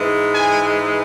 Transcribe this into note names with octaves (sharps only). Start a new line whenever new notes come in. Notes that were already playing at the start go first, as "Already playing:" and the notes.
Already playing: G#2 E3 G#3
G#5